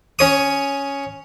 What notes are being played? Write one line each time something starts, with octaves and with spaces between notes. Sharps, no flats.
C#4 C#5 D#6